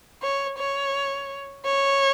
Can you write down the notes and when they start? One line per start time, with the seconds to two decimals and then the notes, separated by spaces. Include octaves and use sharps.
0.22 C#5
0.58 C#5
1.66 C#5